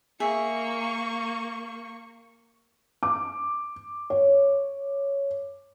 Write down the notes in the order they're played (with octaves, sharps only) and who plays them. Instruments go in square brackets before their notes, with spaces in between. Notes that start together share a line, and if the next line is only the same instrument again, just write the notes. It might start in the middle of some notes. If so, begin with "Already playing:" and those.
[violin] A#3 C#6 [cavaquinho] G#4 E5
[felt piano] D6
C#5